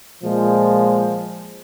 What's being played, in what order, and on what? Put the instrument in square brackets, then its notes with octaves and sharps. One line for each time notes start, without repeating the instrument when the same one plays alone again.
[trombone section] A#2 F3 G#3